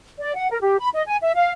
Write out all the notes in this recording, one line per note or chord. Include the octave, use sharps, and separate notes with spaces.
D5
F#5
A#4
G4
B5
D#5
G#5
E5
F5